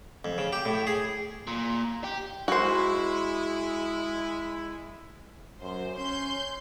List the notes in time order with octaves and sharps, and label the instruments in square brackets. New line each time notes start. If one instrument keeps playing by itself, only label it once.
[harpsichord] F2
C#3
G4
A2
G#4
[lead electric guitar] A#2
G4
[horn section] G#3 E4 [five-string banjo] F#4 C5
[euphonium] F#2 [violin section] C5
[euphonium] C#4 [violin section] C6 G6